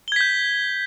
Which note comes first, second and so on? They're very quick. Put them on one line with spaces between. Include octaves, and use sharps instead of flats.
G7 G#6 B6 G6